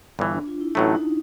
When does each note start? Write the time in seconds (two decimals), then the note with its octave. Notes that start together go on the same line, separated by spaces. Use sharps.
0.19 G1 G2 E3
0.33 D4
0.47 F4
0.61 E4
0.75 A1 A2 F#3 A3 D#4
0.95 D#4